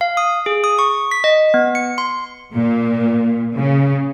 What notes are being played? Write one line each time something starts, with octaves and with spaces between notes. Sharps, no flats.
F5
D#6
G#4
D#6
C#6
B6
D#5
B3
C#7
C6
A#2
C#3